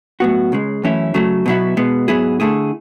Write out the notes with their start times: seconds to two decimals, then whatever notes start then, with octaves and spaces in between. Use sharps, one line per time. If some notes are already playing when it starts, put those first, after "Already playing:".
0.20 A2 F#3 B3 F#4
0.52 C#2 C#3 G#3
0.83 F#2 E3 A3 C#4 E4
1.14 C#3 F#3 A3
1.46 B2 F#3 B3 E4
1.77 B2 G#3 B3
2.08 G#2 F#3 B3 E4 G#4
2.40 D3 A3 E4 G#4